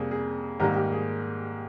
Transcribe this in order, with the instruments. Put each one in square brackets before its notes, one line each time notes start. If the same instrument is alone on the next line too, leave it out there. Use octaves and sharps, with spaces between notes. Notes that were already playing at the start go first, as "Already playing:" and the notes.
Already playing: [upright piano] F2 C3 G3 A#3 G#4
G#4
G#2 D#3 G3 A#3 G4 A#4
G4
G#4